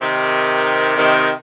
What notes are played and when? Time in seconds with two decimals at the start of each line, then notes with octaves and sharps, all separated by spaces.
0.01 C3 D#3
0.97 C3 D#3